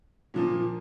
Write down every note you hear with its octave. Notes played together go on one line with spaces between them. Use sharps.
A#2 F3 A#3